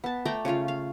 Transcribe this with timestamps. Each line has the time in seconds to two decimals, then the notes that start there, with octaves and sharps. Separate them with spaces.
0.04 B3 A5
0.25 A3 D5 G5 A#5
0.45 C#3 C#4 F4 F5
0.68 F5